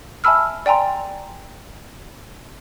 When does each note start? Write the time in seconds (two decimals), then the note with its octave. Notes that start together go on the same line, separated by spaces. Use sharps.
0.24 E5 G#5 A5 B5 E6 F6
0.66 D5 G5 G#5 A#5 C6